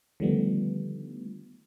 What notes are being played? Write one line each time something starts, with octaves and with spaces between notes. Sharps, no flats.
D3 D#3 F3 G3 A3 B3